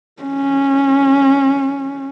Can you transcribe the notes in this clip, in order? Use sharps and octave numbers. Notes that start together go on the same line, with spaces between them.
C#4